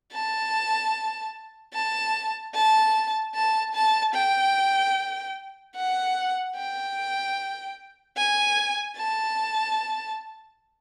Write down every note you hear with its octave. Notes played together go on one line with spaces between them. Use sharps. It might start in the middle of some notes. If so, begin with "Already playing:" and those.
A5
A5
A5
A5
A5
G5
F#5
G5
G#5
A5